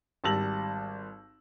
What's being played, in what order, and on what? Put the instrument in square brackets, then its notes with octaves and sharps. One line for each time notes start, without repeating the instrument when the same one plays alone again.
[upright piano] G#1 G3 A5 E6 A#6 F#7